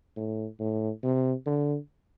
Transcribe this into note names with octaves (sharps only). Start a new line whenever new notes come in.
A2
A2
C3
D3